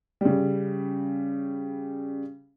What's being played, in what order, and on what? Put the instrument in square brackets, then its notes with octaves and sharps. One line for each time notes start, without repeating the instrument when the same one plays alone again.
[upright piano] C#3 G3